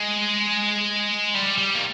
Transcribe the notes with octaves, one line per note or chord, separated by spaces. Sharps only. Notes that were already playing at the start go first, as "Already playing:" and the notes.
Already playing: G#3
G3
G3
A#3